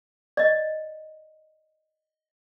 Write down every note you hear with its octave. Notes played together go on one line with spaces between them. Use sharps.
D5 D#5